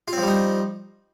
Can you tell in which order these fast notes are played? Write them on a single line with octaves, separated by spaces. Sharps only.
F4 C4 F3 G3 D#4